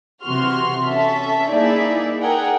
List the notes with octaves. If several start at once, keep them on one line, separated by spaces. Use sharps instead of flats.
C3 E3 F#4 C6 F6
C#4 A4 E5
A#3 D#4 E4 G#4 D5 E5
G#4 A#4 F#5 G5